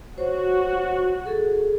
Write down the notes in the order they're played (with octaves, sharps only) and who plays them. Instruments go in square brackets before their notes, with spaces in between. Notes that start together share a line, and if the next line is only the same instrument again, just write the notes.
[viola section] F#4 [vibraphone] C5 C#5
[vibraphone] G#4 A4